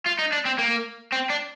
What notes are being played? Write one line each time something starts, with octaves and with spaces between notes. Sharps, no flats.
F4
D#4
D4
C4
A#3
C4
D4